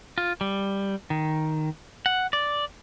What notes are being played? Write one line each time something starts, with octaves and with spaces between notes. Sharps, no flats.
F4
G3
D#3
F#5
D5